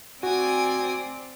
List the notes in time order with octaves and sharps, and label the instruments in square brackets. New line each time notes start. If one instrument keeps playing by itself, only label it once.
[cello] C4 D5 [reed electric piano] F#4 [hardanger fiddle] G#5 D#6